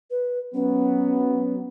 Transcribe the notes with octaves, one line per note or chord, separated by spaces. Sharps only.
B4
F#3 B3 C#4